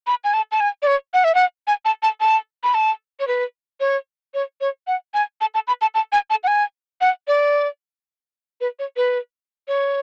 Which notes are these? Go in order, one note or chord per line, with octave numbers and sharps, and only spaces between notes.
B5
G#5
A5
A5
G#5
D5
C#5
F#5
E5
F#5
G#5
A5
A5
A5
B5
A5
C#5
B4
C#5
C#5
C#5
F#5
G#5
A5
A5
B5
A5
A5
G#5
A5
F#5
G#5
F#5
D5
B4
C#5
B4
C#5